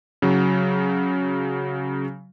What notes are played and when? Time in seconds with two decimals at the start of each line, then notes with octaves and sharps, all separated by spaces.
0.22 C#3 F#3